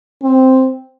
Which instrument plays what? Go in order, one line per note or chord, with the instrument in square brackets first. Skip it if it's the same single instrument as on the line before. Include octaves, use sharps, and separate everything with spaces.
[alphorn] C4